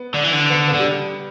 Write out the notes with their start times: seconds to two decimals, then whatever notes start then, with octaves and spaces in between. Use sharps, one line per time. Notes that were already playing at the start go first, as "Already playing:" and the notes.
Already playing: B3
0.14 D3
0.24 E3
0.33 D3
0.50 B3
0.68 B3
0.74 D3
0.80 G3